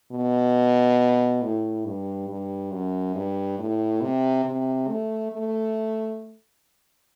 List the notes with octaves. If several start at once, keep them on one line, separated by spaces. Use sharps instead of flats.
B2
A2
G2
G2
F#2
G2
A2
C3
C3
A3
A3